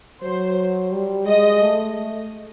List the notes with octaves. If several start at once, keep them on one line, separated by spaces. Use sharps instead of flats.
F#3 C5
G3
G#3 D#5
A3